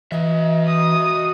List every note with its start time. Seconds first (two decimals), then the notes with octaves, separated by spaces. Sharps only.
0.12 E3 F#4 D#5 E5
0.67 D#6